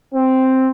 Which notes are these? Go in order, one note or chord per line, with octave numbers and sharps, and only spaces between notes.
C4